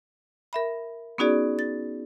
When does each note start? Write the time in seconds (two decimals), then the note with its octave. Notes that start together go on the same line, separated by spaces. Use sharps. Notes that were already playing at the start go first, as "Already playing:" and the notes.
0.53 A#4 E5 B5
1.18 B3 C#4 D#4 F#4 G#4 D5
1.59 A6